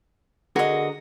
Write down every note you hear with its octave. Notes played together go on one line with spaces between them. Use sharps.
D3 F#4 G#4 A#4 D#5